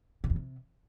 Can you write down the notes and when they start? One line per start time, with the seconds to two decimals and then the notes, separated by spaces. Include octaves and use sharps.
0.24 C3
0.30 E2
0.36 C3